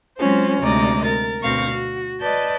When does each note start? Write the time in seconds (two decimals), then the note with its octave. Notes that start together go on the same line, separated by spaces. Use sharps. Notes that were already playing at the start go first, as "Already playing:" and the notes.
0.17 F#3 G#3 C4 C#4 F4 C5
0.60 D2 C3 G#3 D5 D#5 A#5
1.04 A#4 A6
1.41 D2 B2 C4 F5 C#6 A#6
1.71 F#4
2.20 B4 D5 D#5 A5 G6